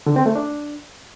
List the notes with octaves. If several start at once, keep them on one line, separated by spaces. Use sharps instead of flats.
D3
C4
A3
D4